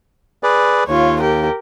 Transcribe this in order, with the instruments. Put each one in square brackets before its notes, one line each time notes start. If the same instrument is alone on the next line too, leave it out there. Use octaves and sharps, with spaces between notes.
[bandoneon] G#4 B4 D5
[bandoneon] D#2 [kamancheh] F4 C#5
[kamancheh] G4 A#4